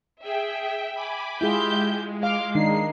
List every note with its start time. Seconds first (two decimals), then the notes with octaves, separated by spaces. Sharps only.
0.23 G#4 E5 G5
0.93 G#5 B5 D6
1.41 G#3 E4 F4 G4 G#4 E5 G6
2.23 F5 C6 D6 F6
2.55 D#3 D4 D#4 C7